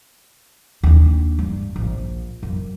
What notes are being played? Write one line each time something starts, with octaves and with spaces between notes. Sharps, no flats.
D#2 D4
G2
A#1
F#2